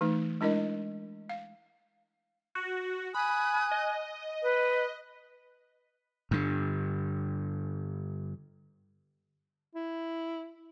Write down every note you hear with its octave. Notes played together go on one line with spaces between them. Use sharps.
E3 A3 D#4
G#3 D4 E4 A#4 D#5
F5
F#4
G#5 B5 D#6 F#6
D#5
B4
G2 D3
E4